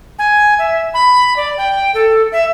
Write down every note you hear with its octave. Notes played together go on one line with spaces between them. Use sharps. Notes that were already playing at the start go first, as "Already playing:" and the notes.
G#5
E5
B5
D5
G5
A4
E5